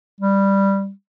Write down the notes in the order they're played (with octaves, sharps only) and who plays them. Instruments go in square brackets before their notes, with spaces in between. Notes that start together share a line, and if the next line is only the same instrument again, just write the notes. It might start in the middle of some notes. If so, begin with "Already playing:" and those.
[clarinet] G3